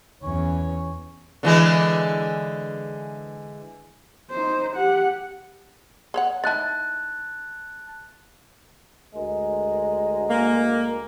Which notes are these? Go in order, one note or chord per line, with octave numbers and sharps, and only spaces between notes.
E2 C#4 C#5
D3 E3 G#3
D#4 C5
G4 F#5
G#4 C#5 F#5
D#4 E4 A5 F#6 A6
D2 G#3 A#4
A#3